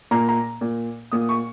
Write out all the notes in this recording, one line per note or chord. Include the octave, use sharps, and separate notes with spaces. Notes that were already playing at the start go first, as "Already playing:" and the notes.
A#2 A#5
A#5
A#2
A#2 D#6
C#6